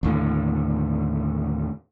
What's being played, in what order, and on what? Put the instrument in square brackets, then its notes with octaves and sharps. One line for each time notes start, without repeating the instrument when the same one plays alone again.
[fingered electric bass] D#2 A2 D3